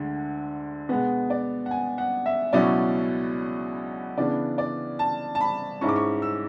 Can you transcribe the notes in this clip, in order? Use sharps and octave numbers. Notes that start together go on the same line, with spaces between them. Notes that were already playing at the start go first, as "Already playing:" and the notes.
Already playing: D2 D3 G#3
B2 G#3 B3 F#5
D5
F#5
G#5
F#5
E5
C#2 B2 F#3 C#4 E4 D5
C#3 E3 B3 D4 D5
D5
A5
A5
B5
G#2 G#3 C#4 E4 C#6
D6
C#6
E6